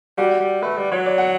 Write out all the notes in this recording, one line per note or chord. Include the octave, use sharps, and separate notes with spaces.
G3 F#4
G3
A3 B4
G3
F#3 C#5
D5
F#5